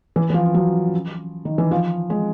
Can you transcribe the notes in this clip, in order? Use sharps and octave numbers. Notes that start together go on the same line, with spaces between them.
E3
E3
F3
F#3
D#3
E3
F3
G#3